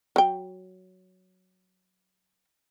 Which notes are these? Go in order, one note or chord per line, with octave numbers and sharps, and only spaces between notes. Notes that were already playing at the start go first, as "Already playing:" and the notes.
F#3 G5